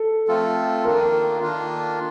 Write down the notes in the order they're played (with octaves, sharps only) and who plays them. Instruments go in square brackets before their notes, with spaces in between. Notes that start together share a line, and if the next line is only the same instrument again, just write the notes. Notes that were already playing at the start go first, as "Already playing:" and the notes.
Already playing: [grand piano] A4
[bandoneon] F3 A3 C4 F4 A4
[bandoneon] D#3 A#3 D4 F4 [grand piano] A#4
[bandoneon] D#3 A#3 D4 F4